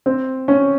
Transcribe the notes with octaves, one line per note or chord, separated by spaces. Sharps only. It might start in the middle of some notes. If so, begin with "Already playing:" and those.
C4
C#4